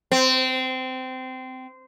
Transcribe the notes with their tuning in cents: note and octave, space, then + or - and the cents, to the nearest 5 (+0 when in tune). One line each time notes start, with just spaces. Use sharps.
C4 -20